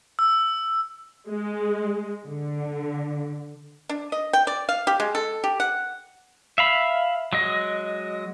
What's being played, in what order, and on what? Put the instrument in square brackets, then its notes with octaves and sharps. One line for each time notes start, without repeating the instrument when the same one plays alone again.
[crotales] E6
[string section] G#3
D3
[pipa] D4
D#5
G5
D5
F5
G4
G#3
A4
G4
F#5
[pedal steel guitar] E5 F5 B5
F#3 G#3 D#5